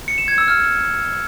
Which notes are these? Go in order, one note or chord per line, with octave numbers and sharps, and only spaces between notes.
C#7
E7
G#6
E6
F6